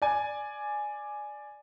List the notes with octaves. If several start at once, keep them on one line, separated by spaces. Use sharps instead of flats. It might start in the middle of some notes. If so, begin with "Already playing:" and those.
D5 G#5